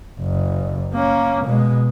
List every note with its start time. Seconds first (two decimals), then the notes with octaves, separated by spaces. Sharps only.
0.20 F#1
0.94 A#3 C#4
1.45 B2 G#3